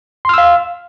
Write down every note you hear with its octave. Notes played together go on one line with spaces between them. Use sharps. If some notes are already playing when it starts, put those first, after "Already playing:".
F5 C6 E6 F6